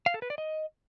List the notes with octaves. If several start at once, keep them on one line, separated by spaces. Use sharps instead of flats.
F5
A4
B4
D5
D#5